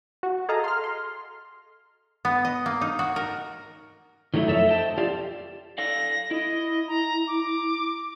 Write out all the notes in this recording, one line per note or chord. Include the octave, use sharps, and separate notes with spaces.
F#4
G#4 A4 D#5 F5 A5 A#5
C6 F6
C6
B3
D#5
A#3
D#4
F#4
A#4
D#3 F#3 A3 D#4 E4
F2 A4 C#5 E5
C5 D#5 G5 A5
F4 G4 D5 F5
A4 D5 F5 A#6
E4 D#5
A#5
D6